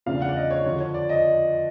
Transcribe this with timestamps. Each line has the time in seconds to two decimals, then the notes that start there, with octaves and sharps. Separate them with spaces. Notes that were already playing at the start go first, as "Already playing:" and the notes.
0.06 E2 C#3 F3 A3 D4 F5
0.22 F#5
0.29 D5
0.36 D#5
0.51 C#5
0.65 F2 D3 F3 C#5
0.80 C#5
0.94 D5
1.09 D#5